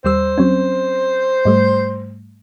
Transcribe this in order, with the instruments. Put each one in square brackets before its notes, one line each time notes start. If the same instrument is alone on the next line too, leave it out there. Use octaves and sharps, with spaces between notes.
[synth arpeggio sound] D#2 G3 E6 [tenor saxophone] C5
[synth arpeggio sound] F#3 C4 C#4
G#2 G3 A3